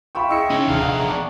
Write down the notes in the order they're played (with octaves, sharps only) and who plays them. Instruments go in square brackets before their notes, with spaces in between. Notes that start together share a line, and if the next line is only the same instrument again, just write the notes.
[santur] F4 E5 G5 [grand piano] B5 C#6
[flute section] E4 G#4 D#5 [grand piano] C#6 E6 C#7
[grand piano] C#3 [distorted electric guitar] D#4 C#5
[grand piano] F1 A#1 [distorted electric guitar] E2 F5 [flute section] G#4 A#5
[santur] D#5 F#5
D4 C#6 D6